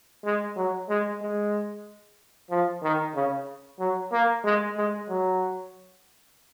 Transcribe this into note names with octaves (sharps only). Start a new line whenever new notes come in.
G#3
F#3
G#3
G#3
F3
D#3
C#3
F#3
A#3
G#3
G#3
F#3